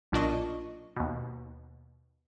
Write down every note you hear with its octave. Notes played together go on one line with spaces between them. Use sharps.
B1 A#2 D4 D#5 C#6
D#2 B2